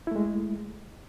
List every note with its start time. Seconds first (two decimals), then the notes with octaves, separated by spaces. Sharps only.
0.07 E4
0.11 A3
0.16 G#3